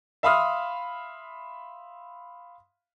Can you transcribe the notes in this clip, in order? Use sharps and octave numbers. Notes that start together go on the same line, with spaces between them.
E5 F5 B5 C6 D#6 F6